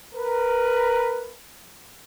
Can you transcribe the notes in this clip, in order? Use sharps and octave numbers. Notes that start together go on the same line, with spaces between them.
A#4 B4